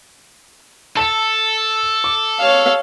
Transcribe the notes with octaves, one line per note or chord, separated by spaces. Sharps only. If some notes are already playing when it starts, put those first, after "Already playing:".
A4 A5 E7
D6
C#5 F5